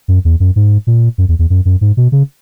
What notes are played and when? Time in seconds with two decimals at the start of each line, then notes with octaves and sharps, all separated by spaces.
0.08 F#2
0.25 E2
0.40 F#2
0.56 G#2
0.87 A#2
1.18 F#2
1.28 E2
1.39 E2
1.50 F#2
1.65 F#2
1.81 G#2
1.97 B2
2.12 C#3